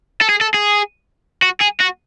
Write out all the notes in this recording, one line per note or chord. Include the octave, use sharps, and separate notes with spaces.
A4
G#4
A4
G#4
F#4
G#4
F#4